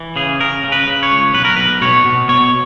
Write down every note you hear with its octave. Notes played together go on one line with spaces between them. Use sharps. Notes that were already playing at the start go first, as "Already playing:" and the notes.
Already playing: E3
C#3 G#4
C#3 A#4
C#3
B4
C#3
C#5
C#2
B1 B4
A#4
B1 B4
B2 C#5
B2
B2 C#5